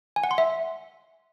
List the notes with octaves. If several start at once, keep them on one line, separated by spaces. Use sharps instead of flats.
G#5
F#5
C6
E5